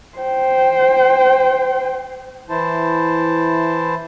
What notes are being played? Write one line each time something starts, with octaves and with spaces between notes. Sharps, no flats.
C5 G5
E3 E4 C5 A5